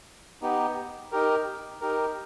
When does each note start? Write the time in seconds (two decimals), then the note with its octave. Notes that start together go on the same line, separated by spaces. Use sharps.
0.42 B3 D#4 G4
1.12 D#4 G4 A#4
1.81 D#4 G4 A#4